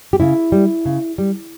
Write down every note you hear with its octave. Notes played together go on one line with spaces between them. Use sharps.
G4
C#3 E4
G3
C#3
G3